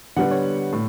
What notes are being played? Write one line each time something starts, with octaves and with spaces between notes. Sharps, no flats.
D3 G3 B3 F#5
C#5
A2